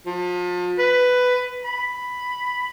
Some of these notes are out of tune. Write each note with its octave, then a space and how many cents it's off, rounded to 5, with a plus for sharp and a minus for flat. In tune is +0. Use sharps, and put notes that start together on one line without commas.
F3 +35
B4 +10
B5 +5